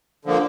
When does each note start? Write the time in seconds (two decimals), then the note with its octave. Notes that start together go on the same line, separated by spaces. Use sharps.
0.25 D3 F3 A#3